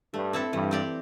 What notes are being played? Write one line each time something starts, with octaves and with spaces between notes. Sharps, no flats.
G2 A3
C4 E4 A4
G2 E3
C4 G4 D5